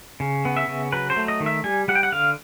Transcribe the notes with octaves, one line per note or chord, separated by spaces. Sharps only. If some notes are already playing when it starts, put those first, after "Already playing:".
C#3
B3
E5
C#3
F#3 B4
C5
A3
D#5
D#3
E5
G3 G#5
G3 F#5
G5
F#5
D3 F5